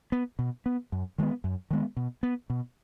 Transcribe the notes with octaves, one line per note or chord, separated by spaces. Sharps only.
B3
B2
B3
F#2
D#3 G#3 B3
F#2
D#3 G#3 B3
B2
B3
B2